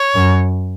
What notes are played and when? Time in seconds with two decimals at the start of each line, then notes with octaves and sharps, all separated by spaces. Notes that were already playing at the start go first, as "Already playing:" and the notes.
Already playing: C#5
0.15 F#2